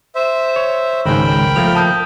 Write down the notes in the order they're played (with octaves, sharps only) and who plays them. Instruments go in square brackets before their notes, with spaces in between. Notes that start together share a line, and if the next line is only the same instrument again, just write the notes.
[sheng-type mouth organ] C5 E5
[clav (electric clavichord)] C#5
[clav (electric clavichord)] G#1 C#2 G#2 [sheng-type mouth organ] A#4 G5 B5
[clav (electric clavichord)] F3 A3 A#3 [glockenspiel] F7
[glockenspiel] A5 D#6 G6